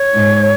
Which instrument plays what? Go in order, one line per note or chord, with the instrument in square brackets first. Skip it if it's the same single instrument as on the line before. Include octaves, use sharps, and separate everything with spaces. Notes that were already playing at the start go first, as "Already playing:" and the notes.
Already playing: [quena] C#5
[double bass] G#2